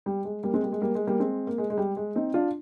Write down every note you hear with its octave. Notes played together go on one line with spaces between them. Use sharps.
G3
G#3
G3 A#3
G#3 C4
G3 A#3
G#3
G3 A#3
G#3
G3 A#3
G#3 C4
A#3
G#3
G#3
G3
G#3
C4 D#4
D4 F4